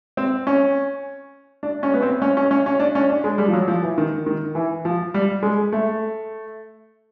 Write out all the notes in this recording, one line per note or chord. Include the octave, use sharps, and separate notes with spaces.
C4
C#4
D4
C#4
B3
C4
C#4
C#4
C#4
C#4
D4
C#4
D4
G#3
G3
F3
F#3
F3
E3
D#3
D#3
E3
F3
G3
G#3
A3